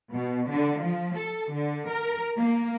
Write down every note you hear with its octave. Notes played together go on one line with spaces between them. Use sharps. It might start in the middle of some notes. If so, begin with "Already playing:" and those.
B2
D3
F3
A4
D3
A#4
A#3